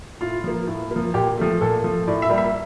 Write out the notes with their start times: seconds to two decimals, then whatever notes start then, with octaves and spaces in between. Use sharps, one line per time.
0.21 A2 F4
0.44 F3 A#3
0.67 A2
0.91 F3 A#3
1.14 A#2 G4
1.38 F3 A3
1.61 A#2 A4
1.83 F3 A3
2.07 A2 D5
2.22 E5
2.30 G3 A#3
2.38 E5